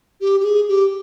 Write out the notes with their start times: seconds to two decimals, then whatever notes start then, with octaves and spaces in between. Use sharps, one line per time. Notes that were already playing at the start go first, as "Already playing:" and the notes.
0.21 G4
0.40 G4
0.44 G#4
0.68 G4